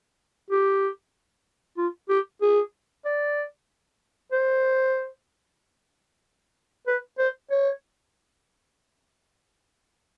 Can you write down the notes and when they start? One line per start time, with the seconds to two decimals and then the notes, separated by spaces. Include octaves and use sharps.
0.50 G4
1.77 F4
2.09 G4
2.41 G#4
3.05 D5
4.32 C5
6.87 B4
7.18 C5
7.51 C#5